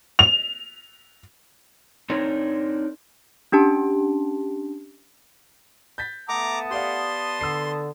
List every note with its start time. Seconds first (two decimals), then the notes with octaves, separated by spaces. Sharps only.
0.19 F7
2.10 C4 D4 D#4 A#4 C#5
3.52 C#4 D4 G4 A5
5.98 G6 A6 B6
6.29 A3 B3 F#5 A5 A#5 D6 D#6
6.71 G4 D5 F5 C6
7.41 D3 E6 C7